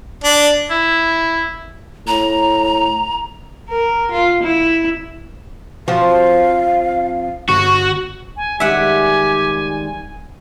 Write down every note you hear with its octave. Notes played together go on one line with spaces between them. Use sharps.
D4
E4
A2 A#5
A#4
F4
E4
F3 C4 F#4 F5
G1 F#4 C#6
G#5
D#3 G3 G#3 G4 E5 F#5 G#5